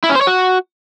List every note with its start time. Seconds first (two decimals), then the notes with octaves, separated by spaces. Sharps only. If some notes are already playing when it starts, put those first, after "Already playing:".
0.04 E4
0.09 C#4
0.15 C5
0.21 C#5
0.27 F#4